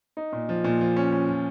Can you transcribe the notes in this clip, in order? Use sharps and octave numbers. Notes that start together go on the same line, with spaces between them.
D#4
A#2
F3
A#2
F3
C#4
C#4
F3